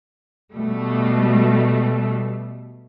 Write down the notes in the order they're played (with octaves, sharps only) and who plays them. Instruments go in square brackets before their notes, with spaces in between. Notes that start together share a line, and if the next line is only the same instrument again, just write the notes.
[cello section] B2 G3 A3